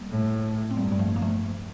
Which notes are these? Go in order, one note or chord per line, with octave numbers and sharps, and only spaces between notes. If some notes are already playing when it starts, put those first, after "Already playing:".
Already playing: G3 A#3
A2
C4
G2 G3 A#3
G3
F3 A3
A#3
F3 A3